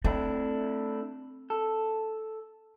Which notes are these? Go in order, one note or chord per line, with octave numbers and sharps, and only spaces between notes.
A3 C4 D4 E4
A4